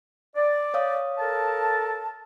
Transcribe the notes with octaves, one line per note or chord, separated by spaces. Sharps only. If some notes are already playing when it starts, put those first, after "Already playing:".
D5
C#5 F5 D#6
A4 A#4 A5